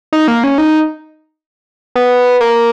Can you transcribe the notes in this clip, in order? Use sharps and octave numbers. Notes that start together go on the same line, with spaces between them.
D#4
A#3
C#4
D#4
B3
A#3